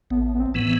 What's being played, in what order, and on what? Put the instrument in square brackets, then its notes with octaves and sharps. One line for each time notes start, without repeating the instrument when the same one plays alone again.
[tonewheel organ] A1 [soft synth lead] B3
[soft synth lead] B3
C4
[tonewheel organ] A2 E3 B3